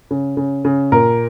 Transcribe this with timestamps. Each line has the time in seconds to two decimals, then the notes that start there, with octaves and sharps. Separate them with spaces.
0.11 C#3
0.37 C#3
0.65 C#3
0.92 A#2 A#4